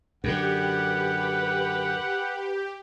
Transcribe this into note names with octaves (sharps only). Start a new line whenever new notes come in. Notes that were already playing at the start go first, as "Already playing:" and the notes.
F#2 D3 G4 B4 F#5